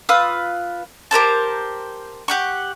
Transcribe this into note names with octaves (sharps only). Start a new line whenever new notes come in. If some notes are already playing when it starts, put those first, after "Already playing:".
F4 B4 D#6 E6
G4 A#4 C5 A5
G4 F#5 C#6